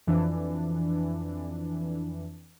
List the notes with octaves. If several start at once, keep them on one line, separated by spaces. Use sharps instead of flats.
F2 E3 D4